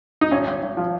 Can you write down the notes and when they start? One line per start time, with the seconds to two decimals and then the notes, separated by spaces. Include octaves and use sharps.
0.21 D#4
0.31 G#1 C#4
0.47 G#1
0.62 G#1
0.77 F3